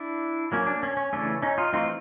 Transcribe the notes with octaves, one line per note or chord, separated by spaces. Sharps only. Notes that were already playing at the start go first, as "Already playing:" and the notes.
Already playing: D4 E4
F#3 A#3 C#4
D4
C#4
C#4
C#3 E3 A3 C#4 D4
C#4 D#4
D#4 F4
E3 A3 C4 D#4 F4